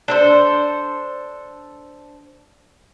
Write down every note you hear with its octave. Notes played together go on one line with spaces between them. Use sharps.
D4 A4 C5